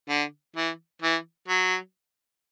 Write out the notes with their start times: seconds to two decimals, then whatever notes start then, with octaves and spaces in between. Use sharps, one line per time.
0.09 D3
0.56 E3
1.02 E3
1.48 F#3